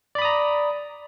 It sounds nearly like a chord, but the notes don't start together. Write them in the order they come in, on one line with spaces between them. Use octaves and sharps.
D5 B5 D#6 A#5